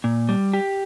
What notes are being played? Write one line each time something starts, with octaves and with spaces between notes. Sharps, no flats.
A#2
G3
G4